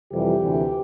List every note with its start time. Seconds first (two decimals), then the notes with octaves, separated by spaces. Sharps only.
0.11 F2 C3 E3 G3 G4
0.41 D2 C3 E3